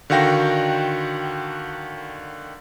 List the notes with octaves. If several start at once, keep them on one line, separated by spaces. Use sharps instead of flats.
D3 D#3 F#4 F5 G5 A#6